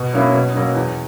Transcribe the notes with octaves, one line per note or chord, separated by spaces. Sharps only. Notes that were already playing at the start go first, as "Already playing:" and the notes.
Already playing: B2
F#3 A#3 C#4 E4
B2
F#3 A#3 C#4
E2